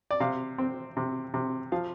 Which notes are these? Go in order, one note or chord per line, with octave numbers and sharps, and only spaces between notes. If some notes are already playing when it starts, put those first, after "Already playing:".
D5
C3 F5
C4
C3
C3
F3 F5